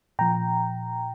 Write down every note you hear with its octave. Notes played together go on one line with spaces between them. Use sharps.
A#2 F3 G5 A#5